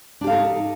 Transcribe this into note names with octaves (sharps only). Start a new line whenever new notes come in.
D4 D#4 G4 A4 F5